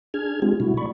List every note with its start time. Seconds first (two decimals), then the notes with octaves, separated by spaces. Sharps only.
0.14 D4 G#4 F6 G#6
0.42 G#3 C4 D4 F4 G4 G#4
0.60 B2 G3 A3 E4 F#4
0.77 D5 B5 C#6